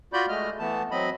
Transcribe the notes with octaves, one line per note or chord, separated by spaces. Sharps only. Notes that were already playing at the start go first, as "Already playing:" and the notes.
F4 F#4 D5 B5 G6
G#3 A3 D#5 F6
E3 A3 B3 A5
F#3 C4 D#5 B5